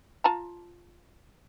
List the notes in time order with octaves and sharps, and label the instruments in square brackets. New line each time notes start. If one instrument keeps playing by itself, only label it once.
[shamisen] F4 A5 A#5